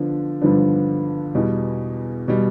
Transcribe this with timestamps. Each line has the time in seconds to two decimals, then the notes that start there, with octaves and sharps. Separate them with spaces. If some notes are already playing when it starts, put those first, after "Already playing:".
Already playing: D3 F3 B3 D4
0.42 G2 D3 F3 B3 D4
1.35 E2 B2 G3
2.28 B2 G3